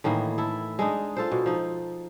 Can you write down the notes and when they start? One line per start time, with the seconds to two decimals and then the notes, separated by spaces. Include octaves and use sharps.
0.04 A2 D#3 E3 A#3
0.38 E4 A4
0.79 G#3 D4 D#4
1.17 F4 A4 C5
1.32 B2
1.46 F3 D#4